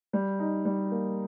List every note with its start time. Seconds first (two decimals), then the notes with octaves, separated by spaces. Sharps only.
0.13 G3
0.39 D#4
0.65 G3
0.91 A#3